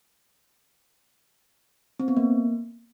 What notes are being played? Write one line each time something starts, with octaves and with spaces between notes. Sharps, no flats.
C4
B3
A#3